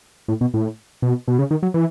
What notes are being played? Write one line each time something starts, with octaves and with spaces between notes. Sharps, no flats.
A2
B2
A2
B2
B2
C#3
D#3
F#3
E3